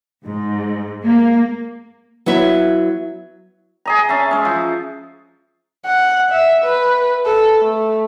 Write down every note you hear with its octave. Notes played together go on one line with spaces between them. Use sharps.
G#2
A#3
F#3 B3 E4 E5
G#4 D#5 A#5
C#4 E5 A5
G#3 C#4
F3
F#5
E5
B4
A4
A3